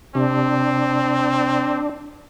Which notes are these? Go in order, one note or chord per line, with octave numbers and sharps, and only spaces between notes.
C3 C4 D4